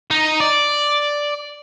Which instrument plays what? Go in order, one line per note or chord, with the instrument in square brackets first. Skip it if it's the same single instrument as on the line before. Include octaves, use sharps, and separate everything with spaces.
[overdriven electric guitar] D#4
D5